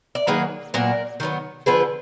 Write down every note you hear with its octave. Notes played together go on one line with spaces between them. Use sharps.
D5
D#3 F#3 A#3 G#4 B4
A#2 F#3 B3 A#4 D5
D#3 F#3 B3
D3 F3 B3 G#4 B4